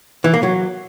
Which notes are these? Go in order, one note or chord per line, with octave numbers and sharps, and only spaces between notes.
E3
A#3
F#3